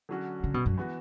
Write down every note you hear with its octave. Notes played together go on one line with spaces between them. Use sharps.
D3 F#3 C#4 F#4
C#3
B2
F#2
E3 B3 F#4